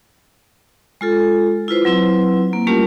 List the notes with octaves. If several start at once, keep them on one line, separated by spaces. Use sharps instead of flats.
G#3 F4 A4
E4 F4 B4 C5
F#3 C4 E4 B4
A#3
G3 A3 C#4 F4 G4 A#4